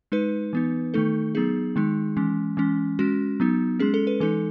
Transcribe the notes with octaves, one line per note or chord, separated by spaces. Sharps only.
G#3 D#4 B4
E3 B3 D#4
D#3 A3 D#4 A4
F#3 B3 D#4 G#4
D#3 G#3 D#4
E3 G#3 C#4
E3 G#3 C#4
G#3 C#4 F#4
F#3 B3 D#4
G#3 C#4 G#4
A4
B4
E3 G#3 D#4 A4